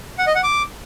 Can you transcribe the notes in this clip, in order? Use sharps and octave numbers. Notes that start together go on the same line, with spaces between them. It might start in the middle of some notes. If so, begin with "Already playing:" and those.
F#5
D#5
F#5
D6